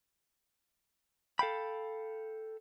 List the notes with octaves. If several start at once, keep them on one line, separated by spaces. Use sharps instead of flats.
A4 F5 G5 B5